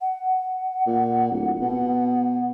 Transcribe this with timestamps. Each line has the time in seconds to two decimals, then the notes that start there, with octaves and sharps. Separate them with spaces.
0.01 F#5
0.87 A#2
1.31 D1
1.61 B2